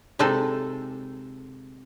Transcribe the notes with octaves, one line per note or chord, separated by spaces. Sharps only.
C3 G#3 D#4 A4